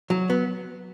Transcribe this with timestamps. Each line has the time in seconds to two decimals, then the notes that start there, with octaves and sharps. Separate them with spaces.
0.10 F#3
0.30 B3